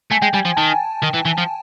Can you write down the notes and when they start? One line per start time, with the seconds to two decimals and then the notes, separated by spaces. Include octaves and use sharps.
0.11 A3 G#5
0.22 G#3 G5
0.34 G3 G#5
0.45 F3
0.57 D#3 A5
1.03 D#3
1.15 E3
1.26 E3
1.38 F3